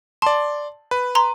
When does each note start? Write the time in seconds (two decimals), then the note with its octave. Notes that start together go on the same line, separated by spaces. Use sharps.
0.22 D5 A5 C6
0.91 B4
1.15 A#5 C6